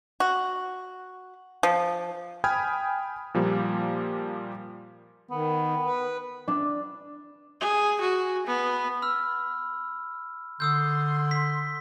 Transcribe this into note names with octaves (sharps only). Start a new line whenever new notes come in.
F#4
F3
G5 G#5 B5 D#6 F6 G#6
A#2 F3 G3 A#3
D#3 B3
B4
D4
G#4
F#4
B3
B5 E6 F6
D3 C6 D#6 E6 G6
B6